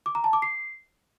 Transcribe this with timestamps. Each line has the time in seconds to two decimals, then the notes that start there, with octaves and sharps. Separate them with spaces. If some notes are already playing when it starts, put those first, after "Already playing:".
0.06 D6
0.15 A#5
0.24 A5
0.33 D6
0.42 C7